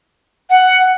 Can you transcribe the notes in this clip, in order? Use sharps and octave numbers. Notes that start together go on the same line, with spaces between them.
F#5